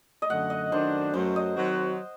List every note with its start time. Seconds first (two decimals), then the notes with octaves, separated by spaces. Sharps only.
0.22 D#5
0.29 F#2 D3 A3 F#5
0.50 D#5
0.72 F#2 D#3 A3 D4 C5
1.14 F#2 F#3 A3 C5
1.36 D#5
1.57 D#3 F#3 C4 F#4